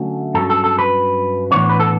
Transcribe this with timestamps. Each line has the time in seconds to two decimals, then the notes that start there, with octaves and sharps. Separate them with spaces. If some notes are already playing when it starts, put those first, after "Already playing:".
Already playing: D3 F#3 A3 C#4
0.34 G2 F#3 C#4 A4
0.50 A4
0.64 A4
0.79 B4
1.51 A2 E3 B3 D4 C#5
1.69 B4
1.80 A4